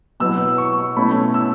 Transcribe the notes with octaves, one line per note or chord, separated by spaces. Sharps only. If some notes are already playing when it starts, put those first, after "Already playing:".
B2 F#3 B3 E4 E6
C#6
B2 A3 C#4 E4 B5
E6